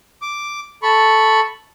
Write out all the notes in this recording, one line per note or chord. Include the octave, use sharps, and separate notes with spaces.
D6
A4 B5 C#6